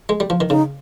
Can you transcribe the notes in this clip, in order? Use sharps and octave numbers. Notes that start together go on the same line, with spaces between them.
G#3
G3
F3
D#3
C#3 D#4